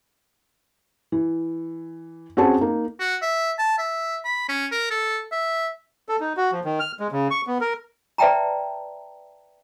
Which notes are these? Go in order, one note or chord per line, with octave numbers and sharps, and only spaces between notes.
E3
C4 C#4 F#4 G#4 A5
A#3 D#4
F#4
E5
A5
E5
B5
C#4
A#4
A4
E5
A4
D#4
F#4
F3
D#3
F6
G#3
C#3
C#6
B3
A#4
B4 D5 E5 G5 A5 A#5